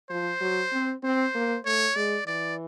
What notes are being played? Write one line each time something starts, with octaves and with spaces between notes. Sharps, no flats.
F3 C5
F#3
C4
C4 C5
A#3
A3 C#5
G#3 D5
E3 D5